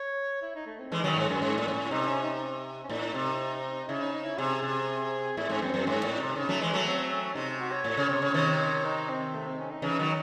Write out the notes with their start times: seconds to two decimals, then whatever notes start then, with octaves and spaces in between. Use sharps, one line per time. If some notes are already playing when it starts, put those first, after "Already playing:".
Already playing: C#5
0.42 E4
0.55 D#4
0.66 A3
0.79 C4
0.92 E3 G#3 C#4
0.99 D#4
1.04 D#3 F#3 C#4
1.16 G#2 C#4
1.29 F#2 C#4
1.42 G#2
1.58 A2
1.68 G#2
1.74 A2
1.91 C3 D#4
2.08 C#4
2.24 D#4
2.84 C#4
2.89 A2 D#4
3.14 C3
3.88 C#3 E4
4.02 D#4
4.13 D#4
4.25 E4
4.38 C3 G#4
4.63 C3
5.37 A2 E4
5.49 G#2 C#4
5.61 F#2 C4
5.74 F#2
5.87 G#2 C#4
6.03 A2
6.12 D#4
6.20 C3
6.36 C#3 D#4
6.49 F#3 A3
6.60 E3 G#3 C#4
6.73 F#3 A3
6.85 C4
7.11 C#4
7.35 C3 D#4
7.60 F#4
7.72 C#5
7.84 A2
7.97 C#3
8.09 C3
8.22 C#3
8.34 C3 D#3
8.84 D#4
9.09 C4
9.34 A3
9.46 C4
9.59 C#4
9.71 D#4
9.82 C#3 E3
9.99 D#3 F#3